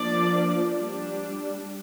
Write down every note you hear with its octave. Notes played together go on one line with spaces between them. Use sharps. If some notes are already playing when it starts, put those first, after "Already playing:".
Already playing: F3 A#3 D4 D5
G3 D4